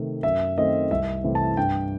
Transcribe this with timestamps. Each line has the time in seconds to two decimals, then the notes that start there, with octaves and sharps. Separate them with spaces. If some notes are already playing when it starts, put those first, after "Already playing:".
Already playing: C3 D#3 A3
0.23 F#2 E5
0.57 D#3 A3 C4 D#5
0.90 C2 E5
1.24 C3 E3 A3 C4
1.35 A5
1.57 G2 G5